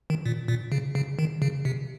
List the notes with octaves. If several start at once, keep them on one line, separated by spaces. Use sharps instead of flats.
D#3
A#2
A#2
C#3
C#3
D#3
C#3
C3